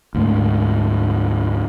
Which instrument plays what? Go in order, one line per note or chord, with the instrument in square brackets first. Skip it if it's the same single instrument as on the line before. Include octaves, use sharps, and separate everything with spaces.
[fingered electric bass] D2 G#2 A3